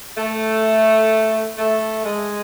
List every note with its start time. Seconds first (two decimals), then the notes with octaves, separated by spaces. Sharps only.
0.17 A3
1.58 A3
2.04 G#3